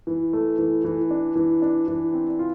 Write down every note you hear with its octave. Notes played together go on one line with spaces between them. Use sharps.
E3
A3
E3
E3
D4
E3
D4
E3
C4
F4